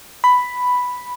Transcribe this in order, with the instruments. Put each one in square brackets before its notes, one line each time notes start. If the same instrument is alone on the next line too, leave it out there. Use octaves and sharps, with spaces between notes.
[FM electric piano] B5